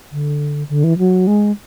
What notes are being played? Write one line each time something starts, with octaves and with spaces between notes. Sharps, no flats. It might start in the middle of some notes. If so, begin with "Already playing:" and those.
D3
D3
E3
F#3
G#3